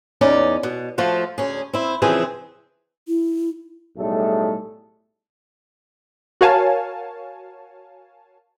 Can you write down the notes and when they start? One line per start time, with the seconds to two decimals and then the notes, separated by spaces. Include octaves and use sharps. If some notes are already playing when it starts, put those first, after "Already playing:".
0.21 E2 C#4 D#4 D5
0.63 B2
0.98 F3 A3 F4 F#4
1.38 D2 C#4 G#4
1.73 C4 E4
2.02 C#3 E3 F3 C4 G#4
3.08 E4
3.97 B1 A2 G3 A3 G#4 A4
6.41 F#4 A#4 C#5 F5 G#5 A5